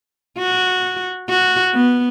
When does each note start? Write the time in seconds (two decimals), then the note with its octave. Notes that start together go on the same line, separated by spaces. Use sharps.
0.38 F#4
1.29 F#4
1.74 B3